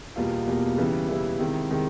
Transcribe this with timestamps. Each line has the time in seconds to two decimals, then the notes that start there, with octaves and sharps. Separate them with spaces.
0.16 E2 B2 G3 A#3 F4
0.47 E2 B2 G3 A#3
0.77 C#3 E3 G3
1.08 C#3 E3 G3 E4
1.39 C3 D#3 G#3
1.70 C3 D#3 G#3